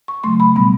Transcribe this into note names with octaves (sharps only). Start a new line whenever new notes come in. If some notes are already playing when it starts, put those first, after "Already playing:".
C#6
C#3 F#3 A3 C6
B5
B2 G3 B3 B5